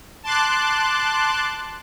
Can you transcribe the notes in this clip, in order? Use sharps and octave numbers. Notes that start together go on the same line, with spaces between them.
A5 C6 D6 F#6